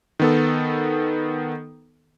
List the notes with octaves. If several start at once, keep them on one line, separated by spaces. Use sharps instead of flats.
D#3 B3 A4